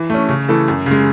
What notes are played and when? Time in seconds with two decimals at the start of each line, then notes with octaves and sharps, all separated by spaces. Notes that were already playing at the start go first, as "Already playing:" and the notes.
Already playing: E3
0.10 A3 C#4
0.29 C#3
0.48 E3 A3 E4 A4
0.68 F#2
0.86 C#3
0.91 G#3